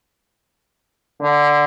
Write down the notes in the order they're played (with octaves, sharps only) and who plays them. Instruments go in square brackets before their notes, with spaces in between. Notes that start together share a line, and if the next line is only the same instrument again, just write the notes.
[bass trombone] D3